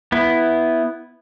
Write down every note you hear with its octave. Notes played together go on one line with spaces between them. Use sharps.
B3 E4